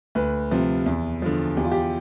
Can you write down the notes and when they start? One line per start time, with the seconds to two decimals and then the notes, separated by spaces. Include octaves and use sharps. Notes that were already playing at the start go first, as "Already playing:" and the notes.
0.15 D2 B4
0.51 C3 F3
0.86 E2
1.22 D3 F3
1.57 E2 G4
1.64 F4
1.72 G4